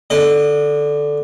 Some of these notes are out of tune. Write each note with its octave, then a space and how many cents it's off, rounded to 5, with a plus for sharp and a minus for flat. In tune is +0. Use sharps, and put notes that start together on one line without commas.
D3 -5 D#5 -35